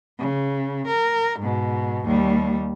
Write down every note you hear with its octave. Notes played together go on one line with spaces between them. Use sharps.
C#3
A#4
G#2 B2
D#2 G3